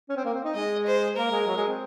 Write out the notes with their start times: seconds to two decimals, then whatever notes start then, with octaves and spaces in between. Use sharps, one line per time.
0.09 C#4
0.17 C4
0.25 A#3
0.34 C4
0.44 D#4
0.55 G#3 D#5
0.86 C5
1.16 A#3 A#4
1.32 G#3
1.47 F#3
1.57 G#3
1.68 C4